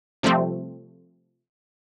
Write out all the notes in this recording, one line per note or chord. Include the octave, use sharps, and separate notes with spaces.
C3 F3 G3 A3 C4